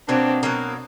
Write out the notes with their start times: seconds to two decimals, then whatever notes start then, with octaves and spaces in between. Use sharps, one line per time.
0.09 B2 F#3 A#3 C4 D4
0.43 B2 F#3 A#3